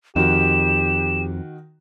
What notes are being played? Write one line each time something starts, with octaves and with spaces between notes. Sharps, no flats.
F2 D#3 F#4 G4 E7